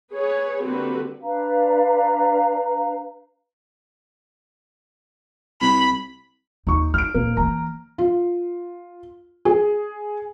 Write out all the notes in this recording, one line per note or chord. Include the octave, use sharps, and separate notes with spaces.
G#4 B4 C#5
D3 G3 A#3 C4 F#4 B4
D4 B4 F5 A#5
C2 B5
D#2 D#4 C#6
D#4 F6 D7
D#1 A#3
E3 A#3 A#5
F4
G#4